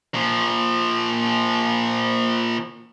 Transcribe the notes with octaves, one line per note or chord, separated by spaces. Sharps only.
A#2 F3